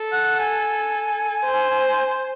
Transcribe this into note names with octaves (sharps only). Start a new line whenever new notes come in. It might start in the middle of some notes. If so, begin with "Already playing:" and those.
Already playing: A4
F#5
G#5
C5